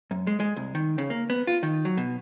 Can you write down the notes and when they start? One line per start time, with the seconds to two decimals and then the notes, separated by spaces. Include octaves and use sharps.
0.11 F#2
0.27 G#3
0.40 G#3
0.56 C2
0.75 D#3
0.98 C#3
1.10 A#3
1.30 B3
1.47 F4
1.63 D#3
1.85 F#3
1.97 B2